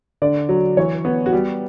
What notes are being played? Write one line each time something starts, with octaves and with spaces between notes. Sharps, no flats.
D3 D5
F#3
E3 C#5
B3
F#4
G3 G4